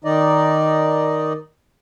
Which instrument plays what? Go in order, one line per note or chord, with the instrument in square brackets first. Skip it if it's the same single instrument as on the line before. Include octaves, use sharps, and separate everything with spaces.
[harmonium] D#3 D#4 D5 D#5